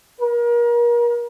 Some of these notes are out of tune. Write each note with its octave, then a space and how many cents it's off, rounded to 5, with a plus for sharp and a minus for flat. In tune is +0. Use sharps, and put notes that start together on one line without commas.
A#4 +35